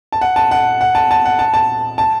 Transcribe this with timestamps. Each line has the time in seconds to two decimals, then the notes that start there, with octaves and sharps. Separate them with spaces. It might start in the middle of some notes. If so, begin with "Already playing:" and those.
0.12 A5
0.21 F#5
0.36 A5
0.51 F#5
0.81 F#5
0.95 A5
1.11 A5
1.25 F#5
1.39 A5
1.54 A5
1.98 A5